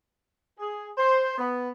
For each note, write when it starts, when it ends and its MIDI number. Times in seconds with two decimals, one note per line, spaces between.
0.58 0.89 68
0.97 1.34 72
1.37 1.69 59